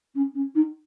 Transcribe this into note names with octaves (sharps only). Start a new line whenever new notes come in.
C#4
C#4
D#4